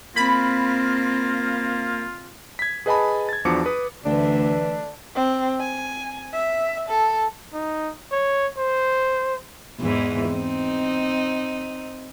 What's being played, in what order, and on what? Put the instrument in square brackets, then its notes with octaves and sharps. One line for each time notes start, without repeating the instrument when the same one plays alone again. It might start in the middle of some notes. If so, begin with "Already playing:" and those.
[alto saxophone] A#3 [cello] C4 [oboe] F4 [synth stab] B5
[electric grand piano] G#6 B6
G#4 B4 D#5 G#5 A5 B5
G#6 A6
E2 F3 D4 F#4 D6 C#7
B4 D#6
[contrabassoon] D2 [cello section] D3 A3 E5 [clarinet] E3 [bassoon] D4
[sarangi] C4
G#5
E5
A4
[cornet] D#4
C#5
C5
[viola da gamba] E2 G#2 E3
C4 D#4